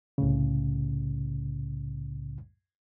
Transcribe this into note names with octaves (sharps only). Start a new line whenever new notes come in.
C2 A2 C#3